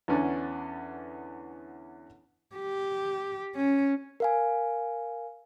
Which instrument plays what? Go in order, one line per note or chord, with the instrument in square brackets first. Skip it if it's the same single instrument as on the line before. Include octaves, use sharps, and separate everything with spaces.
[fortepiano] E2 D3 B3 C#4 D4
[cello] G4
C#4
[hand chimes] A#4 F5 G#5